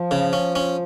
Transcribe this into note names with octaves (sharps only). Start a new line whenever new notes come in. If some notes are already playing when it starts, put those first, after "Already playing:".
Already playing: F3
C#3
C#4
C#4